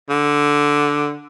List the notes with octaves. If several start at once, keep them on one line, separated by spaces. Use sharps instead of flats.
D3